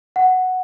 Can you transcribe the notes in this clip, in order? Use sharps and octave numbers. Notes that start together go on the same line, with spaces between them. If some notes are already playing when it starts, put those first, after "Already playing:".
F#5